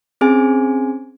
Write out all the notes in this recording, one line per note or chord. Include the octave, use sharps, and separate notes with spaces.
C4 C#4 G#4 C5 G#5